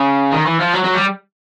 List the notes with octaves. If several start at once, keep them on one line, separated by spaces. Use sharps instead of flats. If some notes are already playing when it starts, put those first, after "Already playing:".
Already playing: C#3
D#3
E3
F3
F#3
F#3
G3